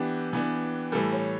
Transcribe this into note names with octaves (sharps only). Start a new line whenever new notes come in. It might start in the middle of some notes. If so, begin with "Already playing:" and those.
Already playing: E3 B3 D4 G4
E3 B3 D4
A2 E3 G3 A4
C#5